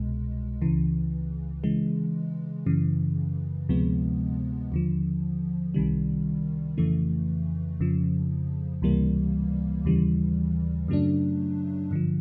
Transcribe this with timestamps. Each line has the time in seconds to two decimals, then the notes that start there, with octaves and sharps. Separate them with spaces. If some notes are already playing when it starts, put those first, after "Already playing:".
Already playing: C2 B2 G#3
0.61 C#2 C#3 E3
1.63 C#3 E3 G#3
2.66 F#2 C#3 E3
3.69 D2 C3 F3 G#3 B3
4.72 D#2 D3 F3
5.74 C2 C3 D#3 G3
6.78 F2 C#3 E3 A3
7.80 F2 C#3 F3
8.82 C#2 C3 E3 G3 A#3
9.85 D#2 C#3 E3 G3
10.88 F#2 C#3 F#3 A3 D4
11.91 G2 D3 F3